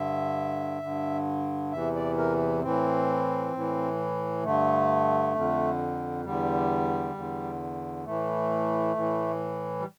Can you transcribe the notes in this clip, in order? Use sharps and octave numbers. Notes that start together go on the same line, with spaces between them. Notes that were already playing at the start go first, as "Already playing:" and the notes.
Already playing: G2 D3 E5
G2 D3
E2 C3 E3 E5
D5
A#4
A2 E3 C4
A2 E3
G2 D3 A3
F2 D3
E2 D3 G3
E2 D3
A2 E3 A3
A2 E3
G3